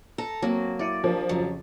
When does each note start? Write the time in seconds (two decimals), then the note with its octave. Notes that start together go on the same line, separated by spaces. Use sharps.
0.18 A4 A#5
0.42 F#3 A#3 C4
0.79 E4 D5 C#7 D#7
1.04 F3 D4 G4 A#4
1.29 F2 C#3 F#3